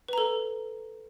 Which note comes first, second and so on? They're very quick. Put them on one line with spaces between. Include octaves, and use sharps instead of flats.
B4 A#5 A4